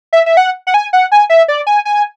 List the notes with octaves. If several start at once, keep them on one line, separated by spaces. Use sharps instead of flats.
E5
E5
F#5
F#5
G#5
F#5
G#5
E5
D5
G#5
G#5